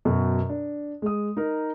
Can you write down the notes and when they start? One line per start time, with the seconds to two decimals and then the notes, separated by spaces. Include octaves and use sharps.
0.05 F#2 B2
0.49 D4
1.02 G#3 D#6
1.37 D#4 A#4